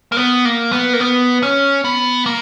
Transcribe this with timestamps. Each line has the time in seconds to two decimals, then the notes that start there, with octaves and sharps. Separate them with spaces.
0.12 A#3
0.17 B3
0.45 A#3
0.73 B3
0.93 A#3
1.00 B3
1.43 C#4
1.85 B3
2.26 A#3